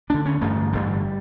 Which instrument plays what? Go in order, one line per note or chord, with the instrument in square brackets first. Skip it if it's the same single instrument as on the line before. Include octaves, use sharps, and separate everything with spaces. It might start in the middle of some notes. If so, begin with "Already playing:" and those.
[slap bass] D2 D3 D4
C#4
A1 G2 D3 A3
A1 G2 D3 G3